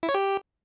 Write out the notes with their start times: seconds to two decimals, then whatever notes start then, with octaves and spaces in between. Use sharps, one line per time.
0.03 E4
0.09 C#5
0.14 G4